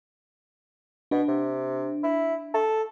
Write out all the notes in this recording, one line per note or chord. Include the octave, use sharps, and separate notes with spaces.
B2 D4
C3
E4
A4